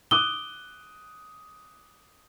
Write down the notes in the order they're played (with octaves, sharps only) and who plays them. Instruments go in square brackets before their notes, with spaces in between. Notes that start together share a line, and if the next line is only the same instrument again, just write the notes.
[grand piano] D6 D#6 F#6 [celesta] G7